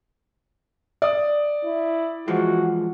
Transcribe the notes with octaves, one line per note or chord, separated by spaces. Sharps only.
D5 D#6
E4
E3 F3 G#3 F#4